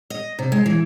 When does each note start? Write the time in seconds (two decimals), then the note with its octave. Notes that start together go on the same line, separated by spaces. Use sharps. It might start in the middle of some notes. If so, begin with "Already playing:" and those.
0.10 D#5
0.39 C3
0.52 G#3
0.66 E3